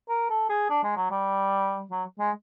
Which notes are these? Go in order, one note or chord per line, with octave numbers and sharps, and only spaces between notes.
A#4
A4
G#4
D4
G#3
F#3
G3
F#3
G#3